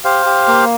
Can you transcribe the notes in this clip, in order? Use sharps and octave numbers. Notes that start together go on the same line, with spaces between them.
G4 C5 F5
G4
A#3